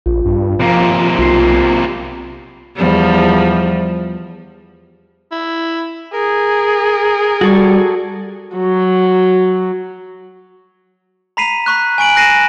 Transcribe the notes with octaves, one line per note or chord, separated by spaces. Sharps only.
A#1 F4
G2
C3 F3 A#3
B1 F4 C7
E2 F3 G3
E4
G#4 A#4
G3 F#4 A4 C#6
F#3
A#5 B5 B6 C7 D#7 F7
B5 C#6 F#6
G#5 C#6 D7 F#7
F#6 A#6 C7 D#7 E7